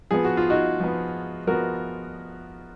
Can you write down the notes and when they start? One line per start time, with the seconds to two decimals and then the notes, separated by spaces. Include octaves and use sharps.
0.11 F3 B3 G#4
0.24 F#4
0.37 F4
0.50 D#4 F#4
0.80 F3 B3
1.47 F3 B3 F#4 A#4